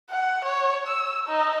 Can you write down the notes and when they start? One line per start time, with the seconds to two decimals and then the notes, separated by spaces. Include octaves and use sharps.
0.10 F#5
0.45 C#5
0.87 E6
1.27 D#4